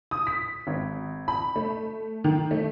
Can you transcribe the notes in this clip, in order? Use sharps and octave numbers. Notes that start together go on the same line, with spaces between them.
D#6
B6
G#1
B5
A3
D#3
A3